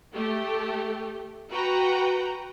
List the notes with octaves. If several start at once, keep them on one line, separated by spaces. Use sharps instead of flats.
A3 G4
F#4 B4 G5 A#5